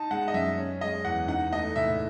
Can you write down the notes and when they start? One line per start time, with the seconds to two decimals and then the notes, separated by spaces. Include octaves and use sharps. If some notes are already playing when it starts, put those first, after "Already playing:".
Already playing: D#4 A5
0.10 G#3 F#5
0.28 D#5
0.34 F#2 E5
0.58 C#4
0.81 G#3 D#5
1.05 E2 F#5
1.28 D#4 F#5
1.52 A3 D#5
1.76 A2 E5